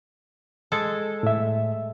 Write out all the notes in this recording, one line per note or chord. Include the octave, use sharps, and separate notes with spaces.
G#3 A4
A2 E5